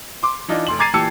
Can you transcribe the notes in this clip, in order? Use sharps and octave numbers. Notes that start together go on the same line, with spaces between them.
C6 D6
E3 D4 D#4 F4
F1 C6 F#7
A#5 D6 G#6 A6 C7 D#7
A#2 E3 G4 A5 E6 C#7